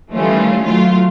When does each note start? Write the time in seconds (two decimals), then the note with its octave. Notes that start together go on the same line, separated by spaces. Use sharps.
0.11 D#3 E3 G3 A3 C#4 F4
0.65 F#3 A3 F4